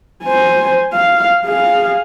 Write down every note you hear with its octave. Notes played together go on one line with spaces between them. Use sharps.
C5 G#5
F5
G#4 F5